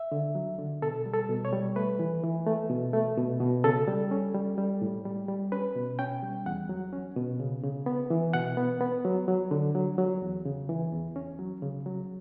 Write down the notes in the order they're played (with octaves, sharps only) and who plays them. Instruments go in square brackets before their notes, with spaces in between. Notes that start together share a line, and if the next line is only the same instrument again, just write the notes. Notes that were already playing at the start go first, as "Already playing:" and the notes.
Already playing: [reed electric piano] E5
D3
F#3
D3
B2 A4
G3
A4
B2
C#5
G3
A3 B4
E3
E3
A3
B2
A3
B2
B2
C#3 A4
G3
C#4
G3
G3
A2
G3
G3
C#4 B4
B2
C#4 G5
G3
E2 F#5
F#3
C#4
B2
C#3
C#3
B3
E3
B2 F#5
B3
B3
F#3
F#3
D3
F#3
F#3
E2
C#3
E3
E2
C#4
F#3
C#3
F#3